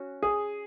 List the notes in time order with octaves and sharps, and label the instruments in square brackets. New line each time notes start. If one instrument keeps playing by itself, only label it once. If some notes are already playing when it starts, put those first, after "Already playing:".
Already playing: [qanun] C#4 F#4
[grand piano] G#4